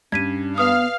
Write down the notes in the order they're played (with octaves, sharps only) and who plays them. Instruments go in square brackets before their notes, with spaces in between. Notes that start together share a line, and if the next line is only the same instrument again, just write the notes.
[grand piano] G2 [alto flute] C#4 [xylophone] G#6 B6 D#7
[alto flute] B3 [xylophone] B4 D#6 [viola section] F5